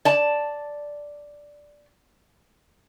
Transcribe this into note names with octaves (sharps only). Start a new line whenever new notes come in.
D5 A5